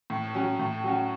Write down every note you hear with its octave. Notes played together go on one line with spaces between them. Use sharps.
A2
F#3 C#4
A2
F#3 C#4 F#4